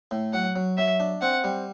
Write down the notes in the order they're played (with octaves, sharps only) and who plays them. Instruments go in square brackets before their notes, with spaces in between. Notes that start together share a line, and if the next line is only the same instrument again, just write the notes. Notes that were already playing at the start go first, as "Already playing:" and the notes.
[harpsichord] A2
[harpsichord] F#3 [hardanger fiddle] F#5
[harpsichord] F#3
[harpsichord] F#3 [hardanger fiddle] E5
[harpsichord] D4
[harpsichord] C4 [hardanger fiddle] F#5
[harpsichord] G3